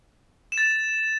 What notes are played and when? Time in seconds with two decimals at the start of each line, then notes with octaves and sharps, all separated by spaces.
0.52 E7
0.58 A6
0.63 E7